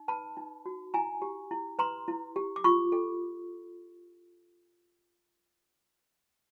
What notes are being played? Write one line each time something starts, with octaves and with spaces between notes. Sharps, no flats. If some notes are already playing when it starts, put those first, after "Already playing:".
Already playing: D#4
B4 A5 B5
D#4
F#4
E4 G#5 A#5
G4
E4
B4 A#5 C6
E4
G4
D6
F4 B5 C#6
A4